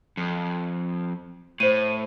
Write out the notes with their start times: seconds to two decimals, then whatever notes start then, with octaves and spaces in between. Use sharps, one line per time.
0.17 F2
1.60 A2 C5 D#7